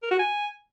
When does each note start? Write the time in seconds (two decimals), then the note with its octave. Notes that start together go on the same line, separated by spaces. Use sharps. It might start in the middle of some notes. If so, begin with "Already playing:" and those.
0.03 A#4
0.11 F#4
0.19 G#5